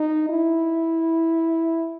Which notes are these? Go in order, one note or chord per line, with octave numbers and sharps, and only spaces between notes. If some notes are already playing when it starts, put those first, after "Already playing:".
Already playing: D#4
E4